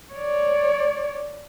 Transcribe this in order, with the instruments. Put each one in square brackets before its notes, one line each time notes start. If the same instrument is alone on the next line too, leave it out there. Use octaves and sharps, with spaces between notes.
[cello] C#5 D5